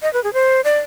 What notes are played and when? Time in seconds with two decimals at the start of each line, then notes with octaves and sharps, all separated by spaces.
0.02 D#5
0.13 B4
0.24 G#4
0.33 C5
0.64 D5